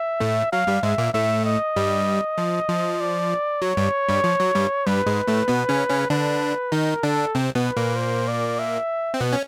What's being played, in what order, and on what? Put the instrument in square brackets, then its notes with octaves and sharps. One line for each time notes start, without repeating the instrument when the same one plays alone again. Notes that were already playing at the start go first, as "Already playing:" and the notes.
Already playing: [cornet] E5
[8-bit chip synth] A2 A3
[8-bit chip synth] F#3 [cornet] F5
[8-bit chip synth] G2 G3
[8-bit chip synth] G#2 G#3 [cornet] E5
[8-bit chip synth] A#2 A#3
[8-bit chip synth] A2 A3 [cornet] E5
[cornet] D#5
[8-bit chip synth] G2 G3
F3
F3
[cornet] D5
[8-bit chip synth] F#3 [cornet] C#5
[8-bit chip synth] G2 G3
G2 G3
F3
F#3
G2 G3
[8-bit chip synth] G2 G3 [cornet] B4
[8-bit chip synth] G#2 G#3
A2 A3
B2 B3
C#3 C#4
C#3 C#4
[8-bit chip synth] D3 D4 [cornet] B4
[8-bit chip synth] D#3 D#4 [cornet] A#4
[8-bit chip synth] D3 D4 [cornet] A4
[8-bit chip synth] C3 C4
B2 B3
[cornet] B4
[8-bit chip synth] A#2 A#3
[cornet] C5
D5
E5
[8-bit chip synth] C4
B2 B3
C#4